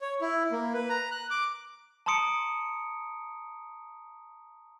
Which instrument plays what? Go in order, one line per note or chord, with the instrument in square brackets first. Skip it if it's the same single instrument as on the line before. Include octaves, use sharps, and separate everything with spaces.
[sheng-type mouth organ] C#5
E4
A#3
B4
A#5
F#6
D6
[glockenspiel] A5 A#5 C6 D#6 C#7 D7